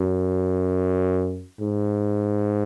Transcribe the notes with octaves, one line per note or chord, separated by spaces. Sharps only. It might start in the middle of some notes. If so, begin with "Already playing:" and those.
Already playing: F#2
G#2